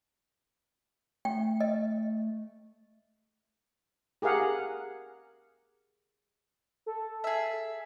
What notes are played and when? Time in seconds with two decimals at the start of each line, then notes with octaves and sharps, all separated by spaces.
1.25 A3 G5
1.60 D#5
4.22 G4 G#4 A#4 F5 F#5
6.86 A4
7.24 G#4 E5